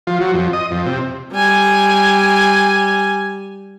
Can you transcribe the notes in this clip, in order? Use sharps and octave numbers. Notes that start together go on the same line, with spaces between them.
F3
F#3
F2
D#5
F2
C3
G3 G#5